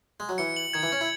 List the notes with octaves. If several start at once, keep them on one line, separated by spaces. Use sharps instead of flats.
G#3
F#3
E3 C#7
F#7
D#3 G#6
E3
C#4 G#6
E4